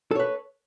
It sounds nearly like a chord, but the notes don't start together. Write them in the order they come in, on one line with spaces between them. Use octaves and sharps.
A4 C#5 B4